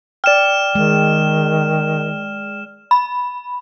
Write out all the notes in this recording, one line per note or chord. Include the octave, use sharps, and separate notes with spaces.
D5 G5 F6 E7
D#3 G#3
B5